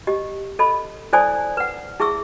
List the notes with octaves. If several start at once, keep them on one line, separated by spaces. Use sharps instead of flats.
G4 D#5
A4 D#5 B5
E4 A4 C5 D5 G#5 D#6
B4 F#5
E4 G#4 E5 C#6 E6